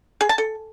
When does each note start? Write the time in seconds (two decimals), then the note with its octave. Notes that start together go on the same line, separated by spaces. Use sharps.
0.21 G#4
0.29 A5
0.38 A4